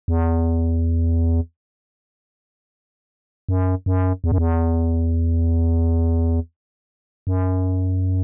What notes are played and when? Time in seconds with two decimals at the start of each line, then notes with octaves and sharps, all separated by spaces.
0.08 E2
3.49 F#2
3.86 F#2
4.24 E2
4.32 F#2
4.38 E2
7.27 F#2